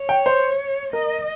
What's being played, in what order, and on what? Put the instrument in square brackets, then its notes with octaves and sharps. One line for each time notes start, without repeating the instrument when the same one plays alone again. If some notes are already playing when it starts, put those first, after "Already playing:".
Already playing: [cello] C#5
[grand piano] G5
C5
[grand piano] A#4 [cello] D#5